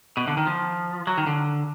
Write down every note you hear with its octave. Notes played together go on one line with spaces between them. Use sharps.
B2
D3
D#3
F3
F#3
D#3
D3